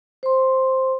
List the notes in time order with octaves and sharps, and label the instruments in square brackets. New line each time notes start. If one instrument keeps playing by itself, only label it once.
[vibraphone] C5 C6